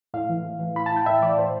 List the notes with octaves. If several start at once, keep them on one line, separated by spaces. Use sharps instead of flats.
A2 F5
E3
A2
E3
A2 B5
A5
E3 G5
A2 E5
E3 D5
A2 C5